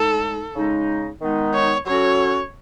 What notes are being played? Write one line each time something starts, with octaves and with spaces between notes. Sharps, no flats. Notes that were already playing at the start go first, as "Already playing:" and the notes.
Already playing: A2 G#3 D#4 A4
C#3 G#3 D#4
D#3 G#3 B3 D#4
C#5
F#3 C#4 F#4 A4 C#5